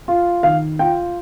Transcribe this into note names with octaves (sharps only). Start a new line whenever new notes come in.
F4
D#3 F5
F4 G5